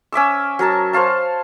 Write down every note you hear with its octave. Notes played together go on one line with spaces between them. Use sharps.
C#4 E5 D6 E6
F#3 A#4 A5
C5 C#5 F5 A5